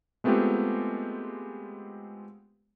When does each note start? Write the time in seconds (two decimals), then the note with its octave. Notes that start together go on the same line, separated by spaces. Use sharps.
0.24 G#3 A3 B3 C4 F4 G4